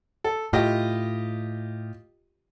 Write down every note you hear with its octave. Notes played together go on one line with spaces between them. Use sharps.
A4
A2 F4 G4 D#5